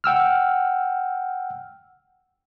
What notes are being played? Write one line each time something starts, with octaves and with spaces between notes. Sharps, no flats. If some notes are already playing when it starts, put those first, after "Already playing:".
F#5 G5 E6 F6